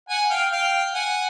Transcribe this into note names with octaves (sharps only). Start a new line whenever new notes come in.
F#5 G#5
F5 G5
F5 G5
F#5 G#5